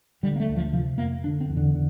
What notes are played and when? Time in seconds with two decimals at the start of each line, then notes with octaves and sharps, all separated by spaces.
0.23 D3 G3
0.36 A#3
0.40 A3
0.48 D2
0.56 F3
0.73 C3 F3
0.98 F2 A#3
1.24 D3 D4
1.41 C4
1.49 E2
1.57 D3
1.74 D3